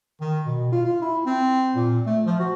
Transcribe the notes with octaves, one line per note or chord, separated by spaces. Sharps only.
D#3
B2
F4
F4
E4
C4
A#2
A3
F3
F#4